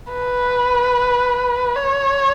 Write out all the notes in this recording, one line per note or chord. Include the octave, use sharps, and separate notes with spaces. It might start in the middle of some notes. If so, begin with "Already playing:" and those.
B4
C#5